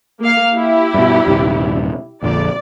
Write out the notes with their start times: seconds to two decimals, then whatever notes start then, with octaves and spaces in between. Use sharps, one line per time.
0.20 A#3 F5
0.55 E4 G4
0.94 G2 B2
1.27 D#1 G2 C3
2.22 A#1 F2 D3 D5